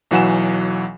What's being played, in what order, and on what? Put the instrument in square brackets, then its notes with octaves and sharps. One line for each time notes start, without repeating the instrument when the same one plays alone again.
[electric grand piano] B1 E3 F#3 F#5 G#5 E7